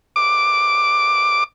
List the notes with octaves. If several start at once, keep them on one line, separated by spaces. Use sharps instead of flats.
D6